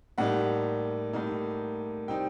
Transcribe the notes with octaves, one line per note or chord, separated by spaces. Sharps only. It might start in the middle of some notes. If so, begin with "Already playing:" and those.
A2 G3 A#3 D#4 F#5
A2 G3 A#3 D#4
C3 G3 C4 D#4 G5